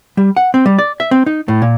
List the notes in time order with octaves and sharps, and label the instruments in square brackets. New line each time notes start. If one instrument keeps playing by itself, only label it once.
[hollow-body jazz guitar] G3
F#5
C4
G3
D5
E5
C4
D#4
A2
A#2